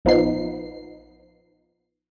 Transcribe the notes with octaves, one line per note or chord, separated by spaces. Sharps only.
A#1 F3 B3 D#4 C7